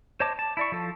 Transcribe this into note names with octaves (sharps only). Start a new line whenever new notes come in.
C5 C#5 D#5 A5 D6
A5
E4 D5 C#6
F3 A4